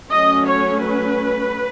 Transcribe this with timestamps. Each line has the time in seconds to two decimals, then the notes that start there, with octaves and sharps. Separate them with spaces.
0.11 F#3 A3 C#4 D#5
0.47 C#5
0.83 B4